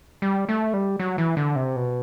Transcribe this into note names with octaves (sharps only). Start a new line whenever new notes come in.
G3
A3
G3
F#3
E3
D3
C3
B2